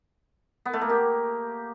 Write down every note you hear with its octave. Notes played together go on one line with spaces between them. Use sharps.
B3
A3
A#3
G4